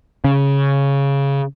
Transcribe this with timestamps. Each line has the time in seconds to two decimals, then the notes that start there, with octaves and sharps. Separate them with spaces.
0.24 C#3